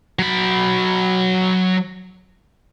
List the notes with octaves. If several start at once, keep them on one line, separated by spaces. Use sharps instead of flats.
F#3 B5